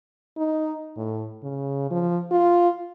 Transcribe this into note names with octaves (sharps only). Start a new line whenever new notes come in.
D#4
A2
C#3
F3
F4